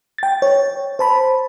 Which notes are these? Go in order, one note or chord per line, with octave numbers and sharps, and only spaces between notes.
G5 A6
C#5
C5 A5 B5